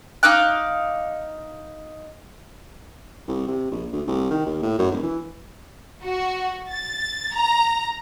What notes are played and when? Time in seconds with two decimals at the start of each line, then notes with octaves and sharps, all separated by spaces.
0.23 D#4 F5 D6 F#6
3.28 C2
3.48 C3
3.71 A#1
3.93 D2
4.07 C2
4.30 D#3
4.46 D#2
4.62 A2
4.79 F#2
4.92 E1
5.03 E3
6.03 F#4
6.71 A6
7.35 A#5